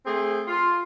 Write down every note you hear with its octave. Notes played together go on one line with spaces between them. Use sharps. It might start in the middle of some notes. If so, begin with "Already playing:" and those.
A3 C4 G#4
F4